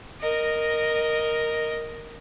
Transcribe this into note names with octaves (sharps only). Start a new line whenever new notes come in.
A#4 D#5